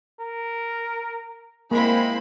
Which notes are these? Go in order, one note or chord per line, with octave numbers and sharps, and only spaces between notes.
A#4
G#3 A#3 C4 E4 B5